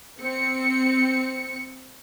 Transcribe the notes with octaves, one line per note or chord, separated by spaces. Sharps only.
C4 C#7